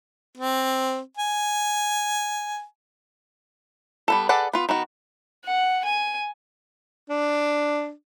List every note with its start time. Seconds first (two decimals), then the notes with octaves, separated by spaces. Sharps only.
0.37 C4
1.17 G#5
4.08 G3 B3 A4
4.29 G#4 A4 B4 D5 F#5
4.53 B3 F4
4.69 D#3 B3 F#4
5.44 F#5
5.85 G#5
7.10 D4